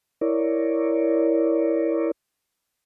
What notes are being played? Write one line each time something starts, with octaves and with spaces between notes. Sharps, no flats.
E4 A#4 C#5 D5